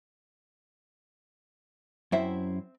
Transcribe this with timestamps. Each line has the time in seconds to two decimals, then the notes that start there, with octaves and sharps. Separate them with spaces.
2.12 F#2 C4 E4 C5 E5